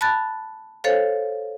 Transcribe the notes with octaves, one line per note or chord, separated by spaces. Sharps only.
A5 B5 F#6 A6
A4 C5 C#5 F5